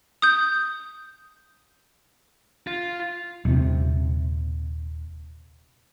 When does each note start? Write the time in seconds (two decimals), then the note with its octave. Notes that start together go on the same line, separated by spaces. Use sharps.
0.22 D#6 G6
2.67 F4
3.45 D#1 C3